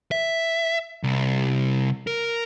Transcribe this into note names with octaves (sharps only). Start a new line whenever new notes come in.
E5
C2
A#4